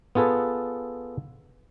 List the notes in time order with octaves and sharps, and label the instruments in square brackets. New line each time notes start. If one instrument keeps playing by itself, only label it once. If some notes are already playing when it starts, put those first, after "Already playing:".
[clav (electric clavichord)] B3 F4 G#4 A4 B4